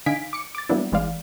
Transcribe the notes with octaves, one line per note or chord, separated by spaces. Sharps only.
D3 D#4 F5 G#5 B6 D7
D6 C#7
D6 A6
F#3 G3 A#3 B3 D4 E4
G#1 E3 G#3 D5 F5